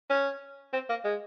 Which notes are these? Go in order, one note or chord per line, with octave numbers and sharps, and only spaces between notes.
C#4
C4
A#3
G#3